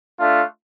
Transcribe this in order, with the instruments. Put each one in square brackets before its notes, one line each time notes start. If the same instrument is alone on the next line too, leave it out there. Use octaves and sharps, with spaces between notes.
[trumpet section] A3 D4 F4